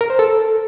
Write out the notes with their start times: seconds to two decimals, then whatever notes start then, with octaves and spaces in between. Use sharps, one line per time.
0.01 A#4
0.10 C5
0.19 A4